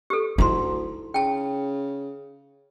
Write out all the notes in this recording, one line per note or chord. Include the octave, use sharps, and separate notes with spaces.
G4 A4
D2 D#4 E4 A#5 C6
C#3 G5 A5